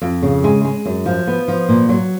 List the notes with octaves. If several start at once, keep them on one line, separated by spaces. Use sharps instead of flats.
F2
C#3
G#3
G#3
F#2
F3
B3
F3
A#2
F#3